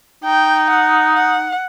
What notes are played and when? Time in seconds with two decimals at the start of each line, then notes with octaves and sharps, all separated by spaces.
0.24 D#4 G5
0.70 F#5
1.15 F#5